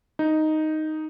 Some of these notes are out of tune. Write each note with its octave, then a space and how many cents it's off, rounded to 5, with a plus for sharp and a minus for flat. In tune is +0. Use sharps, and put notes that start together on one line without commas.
D#4 +0